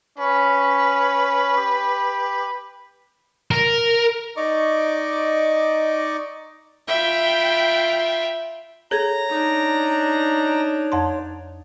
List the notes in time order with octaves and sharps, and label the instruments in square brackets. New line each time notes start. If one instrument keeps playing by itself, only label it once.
[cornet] C#4 [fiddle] B4
[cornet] G4
[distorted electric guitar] A#4
[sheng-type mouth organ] D#4 D5 D#5 C#6 D6
[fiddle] F4 E5 [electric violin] G5 B5
[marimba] G#4 A4 G#6 [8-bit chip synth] C#5 [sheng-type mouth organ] A#5
[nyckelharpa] D4 D#4
[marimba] F2 A5 C6